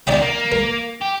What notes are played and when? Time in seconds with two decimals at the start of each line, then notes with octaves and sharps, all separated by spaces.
0.07 B3 D#4 D5 D#5 G5
0.22 A#3
0.52 A#4
1.01 G4